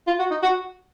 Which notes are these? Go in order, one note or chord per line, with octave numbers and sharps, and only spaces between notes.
F4
F#4
D#4
F#4